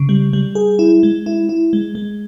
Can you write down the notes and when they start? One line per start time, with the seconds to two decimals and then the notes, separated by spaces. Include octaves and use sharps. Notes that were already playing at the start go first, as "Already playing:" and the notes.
Already playing: C#3
0.09 G3
0.33 G3
0.55 G#4
0.79 E4
1.03 G#3
1.26 E4
1.49 E4
1.73 G#3
1.95 G#3